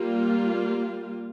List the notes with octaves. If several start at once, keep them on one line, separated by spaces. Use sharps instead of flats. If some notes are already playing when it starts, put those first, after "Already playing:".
Already playing: G3 A#3 F4